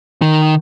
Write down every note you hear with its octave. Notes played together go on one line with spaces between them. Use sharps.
D#3